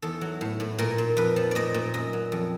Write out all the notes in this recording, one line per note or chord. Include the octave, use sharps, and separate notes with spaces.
E2 A4
F#3
A2
A2
A#2 A#4
A#2
F2 B4
F3
A#2 D5 D#5
A#2
F#2 D#5
F#3
F2